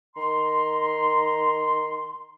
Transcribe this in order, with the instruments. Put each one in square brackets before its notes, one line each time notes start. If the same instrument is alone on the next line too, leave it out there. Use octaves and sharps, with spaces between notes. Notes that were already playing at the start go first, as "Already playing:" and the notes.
[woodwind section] D#3 A#5 C6